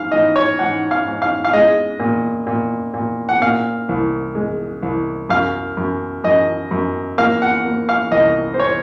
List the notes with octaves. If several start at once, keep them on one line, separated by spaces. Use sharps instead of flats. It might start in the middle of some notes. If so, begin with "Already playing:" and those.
Already playing: G#2 F5
G#2 D#5
C#5
G#2 F#5
F5
G#2
F5
F5
G#3 D#5
A#2
A#2
A#2
F#5
A#2 F5
C2
G#3
C2
F#2 F5
F#2
F#2 D#5
F#2
A#3 F5
F#5
A#3
F5
C2 D#5
C5
C#5